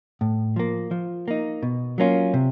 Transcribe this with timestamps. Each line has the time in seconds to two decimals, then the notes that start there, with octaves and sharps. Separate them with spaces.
0.21 A2
0.56 F3 A#3
0.91 F3
1.28 A#3 D#4
1.63 B2
1.98 F#3 A#3 C#4 F4
2.34 C3